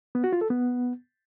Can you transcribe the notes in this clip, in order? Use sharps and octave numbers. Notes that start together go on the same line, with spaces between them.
B3
F#4
F4
A4
B3